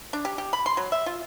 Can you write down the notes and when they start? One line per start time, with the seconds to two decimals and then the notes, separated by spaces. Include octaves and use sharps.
0.13 D4
0.25 G4
0.38 G4
0.53 B5
0.66 C6
0.77 F#3
0.92 E5
1.06 F4